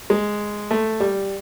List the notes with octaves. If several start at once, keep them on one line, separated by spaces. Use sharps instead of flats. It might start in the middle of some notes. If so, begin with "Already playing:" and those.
G#3
A3
G3